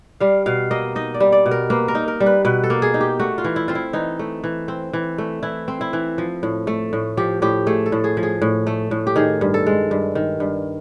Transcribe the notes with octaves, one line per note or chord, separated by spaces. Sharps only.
G3 F5
B2 F5
A#3 D#5
D#4 D#5
D5
G3
D5
B2
A#4
A#3 B4
A#4
D#4
A#4
G3
B4
B2 B4
A4
A#3
G#4
D#4
G4
A3 F#4
F4
E3
E4
C4 F4
E4
E3 D#4
A3
E3
C4
E3
A3
E3 E4
C4
E4
E3
F3
A2
A3
A2
F3 G4
A2 G4
A3 G#4
A4
A2
G#4
F3
G#4
A2
A3
A2
G4
D#3 G#4
G2
A4
G#3
G2
D#3
G2